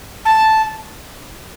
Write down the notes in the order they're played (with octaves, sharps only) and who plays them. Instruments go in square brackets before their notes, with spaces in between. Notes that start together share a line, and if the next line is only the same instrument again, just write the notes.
[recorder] A5